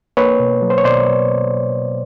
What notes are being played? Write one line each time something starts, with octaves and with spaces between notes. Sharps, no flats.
A#3 B4 C#5
B2
F#3
C5
C#5
B2 C5 D5